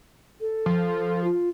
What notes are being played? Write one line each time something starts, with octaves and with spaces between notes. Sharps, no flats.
A4
F3
F4